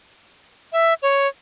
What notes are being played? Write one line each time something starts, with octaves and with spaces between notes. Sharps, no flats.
E5
C#5